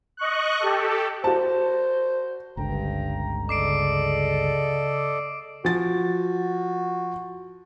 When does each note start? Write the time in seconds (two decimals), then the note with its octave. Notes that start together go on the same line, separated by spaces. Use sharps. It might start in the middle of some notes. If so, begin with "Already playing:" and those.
0.17 D#5 C#6 F#6
0.60 G4 A4
1.24 F#4 C5 A5
2.57 G1 C#2 G2 D3 G5 A#5
3.49 C#3 A4 D5 D#5 D6 C7 D7
5.65 F3 F#4 A6